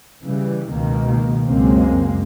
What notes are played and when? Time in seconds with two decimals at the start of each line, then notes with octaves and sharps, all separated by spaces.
0.24 C#3 E3 G3
0.71 C#2 B2 D#3 A#3
1.46 C#2 F#2 G#3 A#3 C4